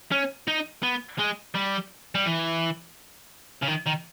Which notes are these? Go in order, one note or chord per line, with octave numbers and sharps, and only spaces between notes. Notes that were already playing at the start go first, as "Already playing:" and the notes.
C#4
D#4
B3
G#3
G3
G3
E3
C#3
D#3
D#3